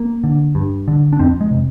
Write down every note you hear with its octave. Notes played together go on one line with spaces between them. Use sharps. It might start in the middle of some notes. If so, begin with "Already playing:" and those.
Already playing: A#3
D3
G2
D3
D4
F2 C4
G#3
C3